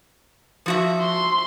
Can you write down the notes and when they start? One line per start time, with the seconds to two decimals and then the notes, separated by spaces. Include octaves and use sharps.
0.66 F3 F#4 E5
1.01 C6